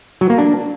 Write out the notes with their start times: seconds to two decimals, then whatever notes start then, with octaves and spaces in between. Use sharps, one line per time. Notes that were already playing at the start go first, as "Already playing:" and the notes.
0.21 F#3
0.30 A#3
0.38 D4